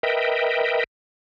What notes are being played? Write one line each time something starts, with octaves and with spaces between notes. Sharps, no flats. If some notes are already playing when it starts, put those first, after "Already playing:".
A#4 B4 D#5 E5 G5